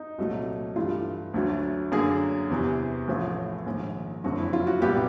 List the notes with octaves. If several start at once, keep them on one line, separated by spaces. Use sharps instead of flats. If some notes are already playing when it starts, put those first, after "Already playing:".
Already playing: D#4
C2 A#2 F#3 A3
G2 E3 A3 F4
D2 D3 F#3 A3
F#2 D3 F#3 A#3 G#4
E2 C3 E3
A1 A2 F3 A3
A#1 G#2 D#3
F#1 F2 D3 F#3 F#4
E4
F4
F#4
C2 A#2 G3 B3 G4